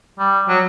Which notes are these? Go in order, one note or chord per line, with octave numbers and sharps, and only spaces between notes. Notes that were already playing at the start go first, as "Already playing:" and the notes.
G3
F#3